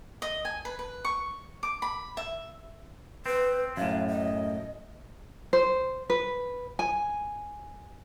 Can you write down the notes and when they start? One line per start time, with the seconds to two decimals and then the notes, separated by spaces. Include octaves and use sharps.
0.22 D#5
0.45 G#5
0.65 B4
0.79 B4
1.05 C#6
1.63 D6
1.82 B5
2.17 E5
3.26 C4 B4
3.77 F#2 A2 F5
4.10 D#5
5.53 C5
6.10 B4
6.79 G#5